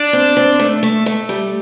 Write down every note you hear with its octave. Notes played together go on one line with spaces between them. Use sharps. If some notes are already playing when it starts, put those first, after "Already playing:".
Already playing: D4
C4
C4
A3
A3
A3
G3